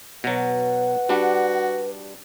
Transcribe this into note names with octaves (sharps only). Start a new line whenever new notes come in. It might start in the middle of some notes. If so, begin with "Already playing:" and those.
B2 F#3 B4 F#5
G3 D4 F#4